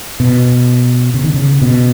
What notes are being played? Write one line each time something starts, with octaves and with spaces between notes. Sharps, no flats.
B2
C#3
D#3
C#3
B2